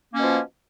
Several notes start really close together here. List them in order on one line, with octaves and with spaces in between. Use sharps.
A#3 C#4 B2 F3